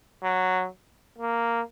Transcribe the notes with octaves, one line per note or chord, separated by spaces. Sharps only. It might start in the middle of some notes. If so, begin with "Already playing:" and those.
F#3
A#3